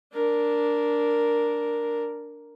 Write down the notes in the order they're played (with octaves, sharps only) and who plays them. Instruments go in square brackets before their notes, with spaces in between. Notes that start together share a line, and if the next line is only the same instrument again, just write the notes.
[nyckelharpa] D4 A#4